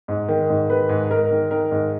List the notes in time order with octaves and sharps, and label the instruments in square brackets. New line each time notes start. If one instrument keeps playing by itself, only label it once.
[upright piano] G#2
D#3
G#2
D#3 B4
G#2
G#2 A#4
D#3
D#3 A#4
G#2